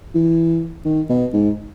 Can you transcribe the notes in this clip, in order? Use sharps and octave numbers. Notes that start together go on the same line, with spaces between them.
E3
D#3
B2
G#2